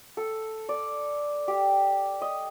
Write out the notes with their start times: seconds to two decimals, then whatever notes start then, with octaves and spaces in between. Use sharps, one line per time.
0.17 A4
0.69 D5
1.48 G4
2.22 D#5